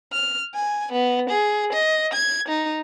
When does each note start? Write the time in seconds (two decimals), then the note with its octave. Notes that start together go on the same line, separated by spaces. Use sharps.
0.13 F6
0.55 G#5
0.92 B3
1.30 G#4
1.73 D#5
2.14 G#6
2.48 D#4